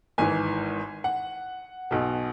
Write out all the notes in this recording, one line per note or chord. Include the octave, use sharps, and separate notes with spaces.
G#1 G#2 E3 G#5
F#5
B1 B2